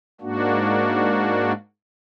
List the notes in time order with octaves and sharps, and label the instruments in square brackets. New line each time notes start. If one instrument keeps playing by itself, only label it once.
[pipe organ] G#2 A#3 D4 F#4